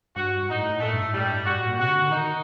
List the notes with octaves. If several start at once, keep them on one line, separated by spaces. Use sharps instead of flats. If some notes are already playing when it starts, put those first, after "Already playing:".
G2 F#4
G2
A2 D#4
A2
A#2 A3
G2
A2
G3
G2
A2
G2 F#4
A2
A#2
C3 F#4
D3
D3
D#3 D#4